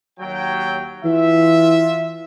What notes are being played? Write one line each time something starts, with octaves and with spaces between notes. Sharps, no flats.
D#2 F#3 G5
E3 F4 E5